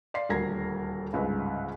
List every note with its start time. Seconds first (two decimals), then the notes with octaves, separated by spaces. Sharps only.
0.14 D5 F5 C6 C7
0.29 D#1 D2 A#4 G#6 A#6
1.13 G1 C#2 G#2 C#3 B4